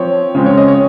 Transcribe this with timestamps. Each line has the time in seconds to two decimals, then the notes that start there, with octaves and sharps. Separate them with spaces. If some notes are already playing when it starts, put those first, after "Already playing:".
Already playing: F3 C4 C#5
0.35 C#3 F3 G#3 C4
0.46 C#5
0.57 D#5
0.68 C#5